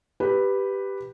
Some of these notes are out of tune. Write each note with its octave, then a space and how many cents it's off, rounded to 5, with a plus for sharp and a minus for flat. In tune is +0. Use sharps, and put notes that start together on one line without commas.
G4 +0 B4 +0